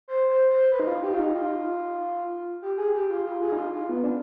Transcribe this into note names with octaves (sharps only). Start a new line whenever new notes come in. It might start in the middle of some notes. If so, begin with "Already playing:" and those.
C5
C5
C5
B4
D#4
F4
G4
F4
D#4
F4
G4
G#4
G4
F4
F4
G#4
D#4
F4
F4
B3
D4